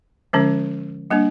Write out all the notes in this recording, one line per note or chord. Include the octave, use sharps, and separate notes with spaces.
D3 F3 G#3 C#4
G3 A#3 D4